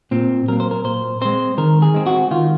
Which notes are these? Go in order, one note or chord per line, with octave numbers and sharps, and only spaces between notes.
A#2 C4
F#3 A#3 A#4
C5
A#4
A#2 C5
G#3 C4 C5
D#3 A#4
G#4
G#3 C4
F#4
D#3 F4